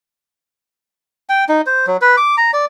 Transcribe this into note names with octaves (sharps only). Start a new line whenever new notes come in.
G5
D#4
C5
F#3
B4
D6
A#5
D5